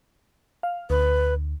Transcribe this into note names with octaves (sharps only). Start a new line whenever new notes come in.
F5
D2 B4